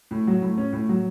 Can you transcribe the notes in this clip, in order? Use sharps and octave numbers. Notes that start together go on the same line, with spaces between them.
A2
F#3
A2
C#4
A2
F#3